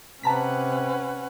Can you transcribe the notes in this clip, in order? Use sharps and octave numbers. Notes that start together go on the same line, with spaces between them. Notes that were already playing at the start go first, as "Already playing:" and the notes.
C3 C#4 B4 F#5 A5 A#5 B6